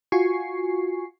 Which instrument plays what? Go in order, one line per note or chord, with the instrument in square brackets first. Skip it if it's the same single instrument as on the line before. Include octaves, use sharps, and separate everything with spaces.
[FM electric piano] F4 F#4 G#5 C#6 C7